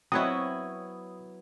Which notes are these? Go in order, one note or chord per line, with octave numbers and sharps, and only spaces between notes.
F#3 B3 C4 E4 C#5 D#6